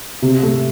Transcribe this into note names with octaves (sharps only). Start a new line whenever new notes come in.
C3
A3